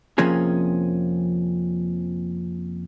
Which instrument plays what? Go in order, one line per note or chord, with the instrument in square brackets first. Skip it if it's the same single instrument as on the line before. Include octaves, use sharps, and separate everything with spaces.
[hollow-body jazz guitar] F2 C3 F3 A#3 C#4 G#4